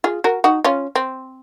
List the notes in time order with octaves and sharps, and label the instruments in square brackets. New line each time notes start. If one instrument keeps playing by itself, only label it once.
[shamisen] F4 G#4
F#4 A#4
D#4 F#4
C#4 F4
C4